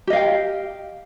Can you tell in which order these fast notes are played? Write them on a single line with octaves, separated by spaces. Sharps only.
G4 D#5 F5 G5